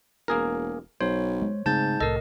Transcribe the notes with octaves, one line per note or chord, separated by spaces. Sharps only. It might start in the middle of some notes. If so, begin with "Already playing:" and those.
E1 A#3 G#4 A#4
B1 C5 C#5
G#3
G#2 C#3 A3 C4 A5 G6 A6
C2 A2 A4 A#4 D#5